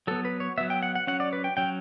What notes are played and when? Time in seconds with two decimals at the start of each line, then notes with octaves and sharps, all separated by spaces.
0.07 F#3 B3 A4
0.25 B4
0.40 C#5
0.58 F#3 B3 E5
0.70 G5
0.83 F#5
0.95 F#5
1.07 F#3 C#4 F#5
1.20 D5
1.33 B4
1.44 G5
1.57 F#3 C#4 G5